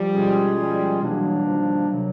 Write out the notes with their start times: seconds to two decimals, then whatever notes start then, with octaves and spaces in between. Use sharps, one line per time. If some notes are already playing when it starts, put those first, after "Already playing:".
Already playing: F3 G3
0.13 B2 G#3 C#4 F4 G#4
0.57 F3 G3
1.02 B2 E3 F#3 G3 A#3 D4
1.46 D#3 F3
1.90 C3 D#3 F#3